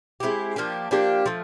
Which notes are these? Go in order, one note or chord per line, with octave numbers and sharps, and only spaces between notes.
G#3 C4 E4 G4
F3 A#3 D4 G4
F3 A#3 D4 G4
F3 A3